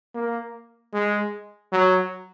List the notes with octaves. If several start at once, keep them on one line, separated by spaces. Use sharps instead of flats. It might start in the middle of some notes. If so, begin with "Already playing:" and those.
A#3
G#3
F#3